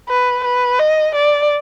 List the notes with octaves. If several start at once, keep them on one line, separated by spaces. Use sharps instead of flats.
B4
B4
D#5
D5